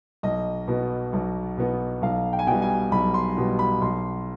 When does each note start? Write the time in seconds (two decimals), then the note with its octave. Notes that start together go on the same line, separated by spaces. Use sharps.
0.23 B1 D#5
0.68 B2 B3
1.13 B1
1.58 B2 B3
2.02 B1 F5
2.33 G5
2.39 G#5
2.47 B2 G3 G5
2.62 G#5
2.91 B1 B5
3.14 C6
3.37 B2 G3
3.59 B5
3.82 B1 C6